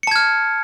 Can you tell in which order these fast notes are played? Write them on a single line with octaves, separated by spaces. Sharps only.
C#7 A5 G#6 F6